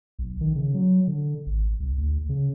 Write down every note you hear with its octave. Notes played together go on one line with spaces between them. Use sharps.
B1
D#3
C#3
F#3
D3
G#1
C2
D2
C#3